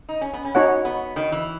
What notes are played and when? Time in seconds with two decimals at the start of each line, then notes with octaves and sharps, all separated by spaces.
0.09 D#4
0.21 C#4
0.33 B3
0.45 C#4
0.55 D#4 F#4 C#5 F#5
0.85 B3
1.16 D#3
1.32 E3